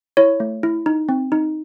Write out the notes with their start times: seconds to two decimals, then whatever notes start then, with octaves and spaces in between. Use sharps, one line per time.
0.17 E4 C#5
0.40 A3
0.63 E4
0.86 D#4
1.09 C4
1.32 D#4